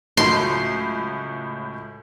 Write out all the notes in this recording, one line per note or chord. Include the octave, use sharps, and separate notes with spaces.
C#2 A2 F#3 C6